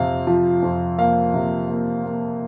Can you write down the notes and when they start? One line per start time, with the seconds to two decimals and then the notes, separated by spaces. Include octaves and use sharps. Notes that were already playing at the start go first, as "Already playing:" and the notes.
Already playing: F2 C3 F5
0.27 F3
0.63 F2
0.98 A#3 F5
1.34 C3
1.68 A#3
2.04 A#3